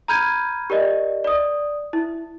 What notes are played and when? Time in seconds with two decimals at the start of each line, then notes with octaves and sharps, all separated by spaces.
0.08 A#5 B5 F6 G6 G#6 D#7
0.70 G4 A#4 D5 D#5
1.24 D5 D#6
1.93 E4